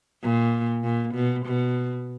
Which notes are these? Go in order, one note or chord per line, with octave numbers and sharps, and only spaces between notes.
A#2
A#2
B2
B2